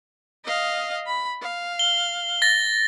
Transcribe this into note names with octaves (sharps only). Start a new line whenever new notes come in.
D#5 F5
B5
F5
G7
A6 A#6